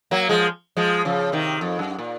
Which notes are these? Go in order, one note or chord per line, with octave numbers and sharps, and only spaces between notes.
F#3 A#3
F3 G#3
F3 G#3
C#3 F3
C3 D#3
F2
F#2
A#2